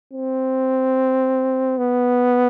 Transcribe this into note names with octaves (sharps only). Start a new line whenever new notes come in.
C4
B3